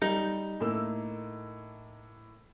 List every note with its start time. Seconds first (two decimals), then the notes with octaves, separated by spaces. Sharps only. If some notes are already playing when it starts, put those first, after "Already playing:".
0.02 G3 D#4
0.60 A2 A#3 E6